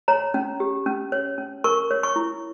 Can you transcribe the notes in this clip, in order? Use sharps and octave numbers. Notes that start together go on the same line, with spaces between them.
C#5 A#5
C#4
G4
C#4
C#5
C#4
A#4 C#6
C#5
C#6
E4